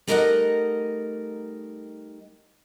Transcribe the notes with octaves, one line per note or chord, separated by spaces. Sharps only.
G3 A3 D#4 A#4 D#5 F#5